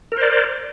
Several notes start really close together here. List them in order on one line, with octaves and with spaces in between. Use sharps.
A#4 C5 D5